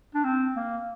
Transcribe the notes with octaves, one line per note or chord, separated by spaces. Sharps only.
D4
C4
A#3